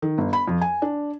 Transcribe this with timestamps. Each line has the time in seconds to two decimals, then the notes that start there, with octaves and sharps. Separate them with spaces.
0.02 D#3
0.18 G1
0.33 B5
0.48 F2
0.61 G#5
0.82 D4